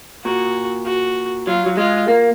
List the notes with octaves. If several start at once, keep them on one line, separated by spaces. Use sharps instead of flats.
A#2 F#4
F#4
F#3 F4
F#3
G#3 F4
A#3